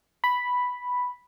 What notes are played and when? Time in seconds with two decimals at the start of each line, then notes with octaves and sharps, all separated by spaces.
0.24 B5